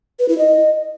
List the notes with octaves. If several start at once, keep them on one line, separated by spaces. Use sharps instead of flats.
B4
E4
D#5